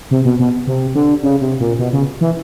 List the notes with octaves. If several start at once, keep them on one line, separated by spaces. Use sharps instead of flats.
C3
B2
B2
C3
D3
C#3
C3
A#2
B2
C#3
E3